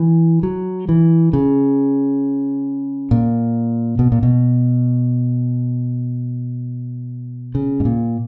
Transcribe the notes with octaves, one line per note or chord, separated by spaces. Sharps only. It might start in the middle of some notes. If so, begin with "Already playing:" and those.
Already playing: E3
F#3
E3
C#3
A#2
B2
A#2
B2
C#3
G#2
A#2